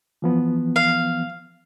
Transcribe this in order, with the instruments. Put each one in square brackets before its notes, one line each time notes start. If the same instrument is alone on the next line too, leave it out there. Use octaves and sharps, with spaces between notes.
[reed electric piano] E3 F3 B3
[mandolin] F5